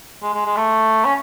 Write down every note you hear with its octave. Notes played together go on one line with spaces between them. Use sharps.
G#3
G#3
G#3
A3
C#4